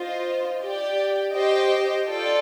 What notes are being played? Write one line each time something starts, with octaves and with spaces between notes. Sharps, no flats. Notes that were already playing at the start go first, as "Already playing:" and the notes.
Already playing: F4 C5 D#5
G4 D5 G5
G4 C5 D#5 G5
F4 A4 D5 G5